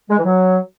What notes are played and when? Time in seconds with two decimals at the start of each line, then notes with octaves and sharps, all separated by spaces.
0.10 G#3
0.17 E3
0.25 F#3